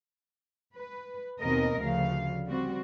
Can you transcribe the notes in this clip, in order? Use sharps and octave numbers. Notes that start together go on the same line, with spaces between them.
B4
D#2 B2 C4 A#4 D#5
D2 C#3 F3 F5
G3 C4 F#4